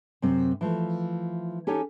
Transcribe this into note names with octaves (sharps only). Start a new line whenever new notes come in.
F#2 C3 C4
E3 F3 A3
C#4 D#4 G4 A4 C#5 G#5